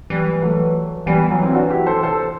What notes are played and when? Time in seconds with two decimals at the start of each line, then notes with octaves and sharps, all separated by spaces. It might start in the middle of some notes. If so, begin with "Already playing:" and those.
0.10 E3 G3
0.26 G3
0.42 F#3 A3
1.06 E3 G3 B3
1.31 F#3
1.42 C4 E4
1.55 D4 F#4
1.70 E4 G4
1.86 A4 C5
2.03 A4 C5